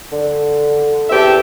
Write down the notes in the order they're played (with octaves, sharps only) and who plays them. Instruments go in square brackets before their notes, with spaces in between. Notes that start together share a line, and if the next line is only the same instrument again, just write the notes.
[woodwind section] D3
[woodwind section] E2 C4 [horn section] G4 A4 E5